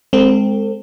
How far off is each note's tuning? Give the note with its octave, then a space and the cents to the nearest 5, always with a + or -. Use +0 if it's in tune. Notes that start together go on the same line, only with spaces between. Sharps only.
G#3 +0 C4 +0 A4 +45